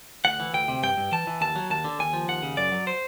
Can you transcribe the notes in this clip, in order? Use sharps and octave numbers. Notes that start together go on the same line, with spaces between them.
D2 F#5
E3
D2 G5
C3
G2 G5
G2
E3 A5
E3
D#2 A5
F#3
D#2 A5
D3
D#2 G#5
F3
D#2 F#5
C#3
F#2 D5
F#3
C5